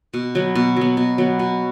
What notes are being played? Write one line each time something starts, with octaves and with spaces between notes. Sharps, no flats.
B2
F#3 B3
B2
F#3 B3
B2
F#3 B3
B2